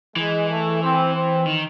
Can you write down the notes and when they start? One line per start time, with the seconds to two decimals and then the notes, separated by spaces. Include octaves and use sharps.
0.16 E3 G#3
0.49 A3
0.82 C4
1.14 C4
1.46 D#3